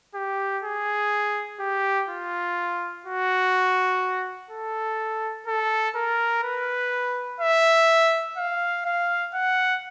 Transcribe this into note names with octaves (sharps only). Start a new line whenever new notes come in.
G4
G#4
G4
F4
F#4
A4
A4
A#4
B4
E5
F5
F5
F#5